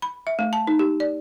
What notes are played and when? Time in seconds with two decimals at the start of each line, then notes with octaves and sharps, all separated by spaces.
0.02 B5
0.27 E5
0.39 A3
0.53 A5
0.67 D#4
0.79 G4
1.00 D5